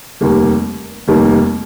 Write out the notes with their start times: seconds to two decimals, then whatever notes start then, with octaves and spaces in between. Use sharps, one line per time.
0.21 F1 D#2 D#3 G3 A#3
1.08 F1 D#2 D#3 G3 A#3